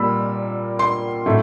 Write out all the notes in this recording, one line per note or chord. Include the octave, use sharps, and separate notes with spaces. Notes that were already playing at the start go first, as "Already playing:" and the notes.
Already playing: A#2 G3 A#3 B5 E6
C6
A2 F#3 A3